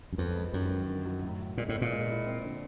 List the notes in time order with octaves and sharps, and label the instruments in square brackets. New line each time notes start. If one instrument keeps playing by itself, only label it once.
[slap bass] F#2
[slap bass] F2 [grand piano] B3
[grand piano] G#3
[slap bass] F#2 [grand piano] D#3
[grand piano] D#3
D3
F#3
A2
A2
[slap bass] A#2 [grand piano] G#3
[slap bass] A2
[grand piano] B2
[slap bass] A#2
[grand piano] G#3
E4
C4
D3